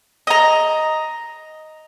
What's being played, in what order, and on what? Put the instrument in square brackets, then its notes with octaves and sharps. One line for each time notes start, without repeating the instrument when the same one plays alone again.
[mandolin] D#5 A#5